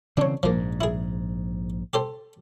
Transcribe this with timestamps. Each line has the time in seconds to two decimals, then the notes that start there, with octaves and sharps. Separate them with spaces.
0.17 C#3 E3 C4 D4 C#5
0.43 A#1 G#2 F3 A#3
0.81 E4 G#4
1.93 G4 A4 C5